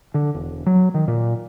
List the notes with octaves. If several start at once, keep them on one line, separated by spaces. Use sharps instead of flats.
D3
E1
F#3
D#3
A#2